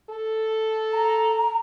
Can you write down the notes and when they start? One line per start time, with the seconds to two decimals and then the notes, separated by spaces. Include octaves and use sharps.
0.10 A4
0.93 A#5